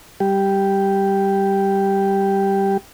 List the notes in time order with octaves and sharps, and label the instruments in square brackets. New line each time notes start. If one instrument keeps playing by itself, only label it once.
[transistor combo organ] G3 G4